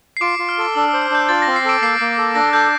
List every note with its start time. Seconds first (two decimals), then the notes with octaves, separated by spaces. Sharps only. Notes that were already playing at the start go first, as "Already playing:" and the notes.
0.17 C7
0.21 F4 D6 D7
0.35 C7
0.39 F4
0.49 F6
0.58 A4 D6
0.75 D4 E6
0.89 E6
0.93 C5
1.02 F6
1.10 D4 G6
1.29 F4 A6
1.42 A#6
1.47 C4
1.56 C7
1.65 A4 D6 D7
1.82 A#3 C7
2.00 A#3
2.18 A4
2.35 D4 A#6
2.53 A4 G6